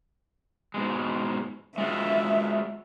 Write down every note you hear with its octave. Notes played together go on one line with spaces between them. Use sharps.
G#2 B2 G#3
G#3 F4 F#4 E5